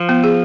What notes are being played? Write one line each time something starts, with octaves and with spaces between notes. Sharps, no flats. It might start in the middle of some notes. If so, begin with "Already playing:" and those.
Already playing: F3
B3
G#4